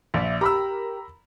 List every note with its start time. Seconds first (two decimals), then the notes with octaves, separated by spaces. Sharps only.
0.14 A#1 D5 E5
0.41 G4 A#4 A#5 B5 E6